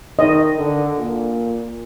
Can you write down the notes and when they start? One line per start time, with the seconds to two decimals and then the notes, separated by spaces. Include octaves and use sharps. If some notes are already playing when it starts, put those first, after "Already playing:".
0.19 D#3 D#5
0.58 D3
0.98 A#2